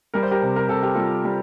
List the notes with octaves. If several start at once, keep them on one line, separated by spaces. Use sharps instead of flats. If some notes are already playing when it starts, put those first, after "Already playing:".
G3 A#4
C5
G4 A#4
C3
A#4
C3 A4
G4
G3 F4 A4
G3